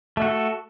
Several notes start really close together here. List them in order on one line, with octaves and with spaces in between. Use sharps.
A3 F#4 A4